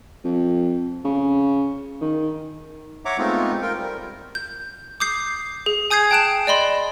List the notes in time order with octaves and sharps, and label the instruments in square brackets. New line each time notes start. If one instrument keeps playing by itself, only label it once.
[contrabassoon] F2
C#3
D#3
[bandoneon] C#5 E5 F#5 A#5 D6
G#3 A3 B3 C4 D#4 F4
F4 A#4 G5
G3 A#4
[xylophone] G6
D6 D#6 G6 C7
G#4
G#5 D#6 G6 G#6 C7
G5 A5 F#6 D7 E7
D5 D#5 B5 C6